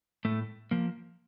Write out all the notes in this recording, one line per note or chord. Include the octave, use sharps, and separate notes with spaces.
A2 A3
F3 A#3